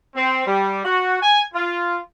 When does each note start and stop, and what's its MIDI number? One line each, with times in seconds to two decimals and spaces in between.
0.15 0.46 60
0.46 0.81 55
0.84 1.18 66
1.21 1.41 80
1.54 1.97 65